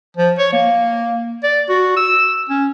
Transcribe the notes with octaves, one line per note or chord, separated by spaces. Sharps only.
F3
C#5
A#3
D5
F#4
E6
C#4